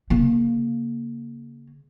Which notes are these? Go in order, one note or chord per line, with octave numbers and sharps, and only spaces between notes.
C#3 A#3